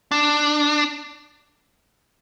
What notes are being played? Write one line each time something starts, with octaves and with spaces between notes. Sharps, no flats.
D4